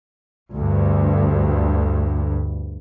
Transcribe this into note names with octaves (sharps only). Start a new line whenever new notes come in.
D2 G2